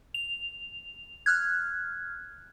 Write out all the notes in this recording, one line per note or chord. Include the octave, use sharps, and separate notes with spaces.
F7
F6 F#6 G#6